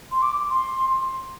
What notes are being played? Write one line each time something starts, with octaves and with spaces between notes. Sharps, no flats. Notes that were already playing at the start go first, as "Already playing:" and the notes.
C6
D6
C6